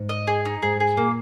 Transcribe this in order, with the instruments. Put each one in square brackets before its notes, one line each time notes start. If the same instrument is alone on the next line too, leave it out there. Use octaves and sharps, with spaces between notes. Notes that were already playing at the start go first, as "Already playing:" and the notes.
Already playing: [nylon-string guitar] G#2
[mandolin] D#5
G#4
D#4
[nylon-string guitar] G#2 [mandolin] G#4
[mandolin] G#4
[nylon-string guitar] A#2 [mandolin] A#3